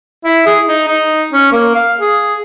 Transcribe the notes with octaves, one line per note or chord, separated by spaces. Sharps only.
E4
G#4
D#4
D#4
C#4
A#3
F5
G#4